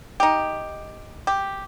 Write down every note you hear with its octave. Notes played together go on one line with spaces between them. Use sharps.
D#4 G4
G4